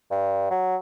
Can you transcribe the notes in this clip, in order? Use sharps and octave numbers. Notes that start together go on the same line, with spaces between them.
G2
F#3